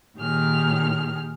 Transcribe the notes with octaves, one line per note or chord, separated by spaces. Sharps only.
A#2 D#3 G4 G#4 F6